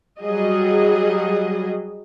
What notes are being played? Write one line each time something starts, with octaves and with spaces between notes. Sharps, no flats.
F#3 G3 G#4 D#5